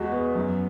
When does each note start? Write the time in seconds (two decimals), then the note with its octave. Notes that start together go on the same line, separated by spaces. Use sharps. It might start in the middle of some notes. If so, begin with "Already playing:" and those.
Already playing: E2 G#3 F#4
0.12 B3
0.35 F#2